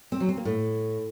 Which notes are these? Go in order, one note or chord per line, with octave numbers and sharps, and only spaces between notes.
C4
F#3
C4
A#3
A2